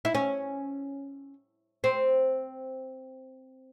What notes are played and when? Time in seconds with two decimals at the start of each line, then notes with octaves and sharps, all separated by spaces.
0.05 E4
0.15 C#4
1.84 C4